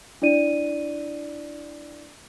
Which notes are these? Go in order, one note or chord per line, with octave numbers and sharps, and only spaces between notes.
D4 E4 D5 D#7